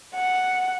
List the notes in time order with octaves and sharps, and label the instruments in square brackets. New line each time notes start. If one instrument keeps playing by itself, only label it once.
[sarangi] F#5